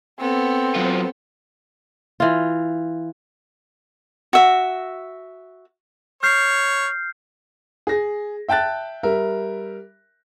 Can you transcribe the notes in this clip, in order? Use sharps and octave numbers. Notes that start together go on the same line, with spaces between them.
B3 C4 A4
F#3 F4
E3 F4
F#4 E5
C#5 F6 G6 C7
G#4 A#6
E5 G5 A5 F#6 A6
G3 A#4 E5